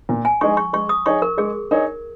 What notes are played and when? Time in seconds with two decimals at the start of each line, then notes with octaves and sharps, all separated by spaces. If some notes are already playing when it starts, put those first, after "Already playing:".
0.09 A#2
0.25 G#5
0.41 G#3 D#4 G#4 C#6
0.57 C#6
0.73 G#3 C#6
0.89 D#6
1.06 D#4 G#4 C#5 C#6
1.22 A#4
1.38 G#3 G#4
1.71 D#4 G#4 A#4 C#5